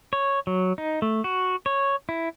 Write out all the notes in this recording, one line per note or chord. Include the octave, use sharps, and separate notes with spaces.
C#5
F#3
D#4
A3
F#4
C#5
E4